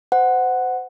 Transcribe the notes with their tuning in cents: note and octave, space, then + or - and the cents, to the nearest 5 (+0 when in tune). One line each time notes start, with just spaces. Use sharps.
C5 -30 F#5 +0